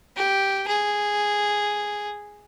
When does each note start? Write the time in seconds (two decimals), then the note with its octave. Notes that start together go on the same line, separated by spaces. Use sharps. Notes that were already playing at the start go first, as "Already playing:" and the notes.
0.17 G4
0.68 G#4